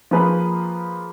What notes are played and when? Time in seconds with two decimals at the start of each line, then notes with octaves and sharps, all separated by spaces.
0.11 F3 A#3 F4 G#4 B4